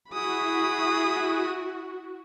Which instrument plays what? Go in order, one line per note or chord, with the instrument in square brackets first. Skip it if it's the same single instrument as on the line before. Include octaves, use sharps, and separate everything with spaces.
[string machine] E4 [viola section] F#4 [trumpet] G#4 [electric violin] B5 D#6